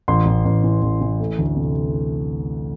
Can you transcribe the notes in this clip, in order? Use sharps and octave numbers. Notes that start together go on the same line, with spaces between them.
A1 C6
A1
A1
E3
A1
E3
A3
D2
C3